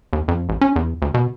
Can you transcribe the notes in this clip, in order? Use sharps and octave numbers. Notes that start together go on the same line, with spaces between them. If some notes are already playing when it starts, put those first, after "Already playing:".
D#2
F2
A1
C#4
E2
D2
B2